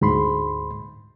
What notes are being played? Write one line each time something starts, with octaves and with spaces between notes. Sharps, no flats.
D2 G#2 B5 C6